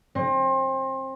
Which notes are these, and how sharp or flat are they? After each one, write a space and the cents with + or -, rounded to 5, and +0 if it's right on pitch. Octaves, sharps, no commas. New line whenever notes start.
C4 +30